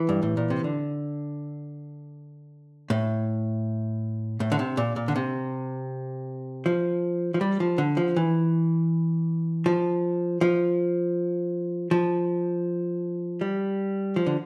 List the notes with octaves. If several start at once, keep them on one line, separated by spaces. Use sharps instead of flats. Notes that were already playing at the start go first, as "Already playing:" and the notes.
Already playing: E3
G2
A2
A#2
C3
D3
A2
A2
D3
C3
A#2
A#2
D3
C3
F3
F3
G3
F3
D3
F3
E3
F3
F3
F3
G3
F3
D3